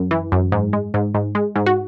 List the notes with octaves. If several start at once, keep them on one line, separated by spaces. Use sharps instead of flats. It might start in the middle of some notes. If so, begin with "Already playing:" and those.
Already playing: F#2
E3
F#2
G#2
G#3
G#2
G#2
G#3
G#2
F#4